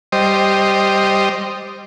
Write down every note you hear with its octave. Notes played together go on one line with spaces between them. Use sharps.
G3 C5 D#5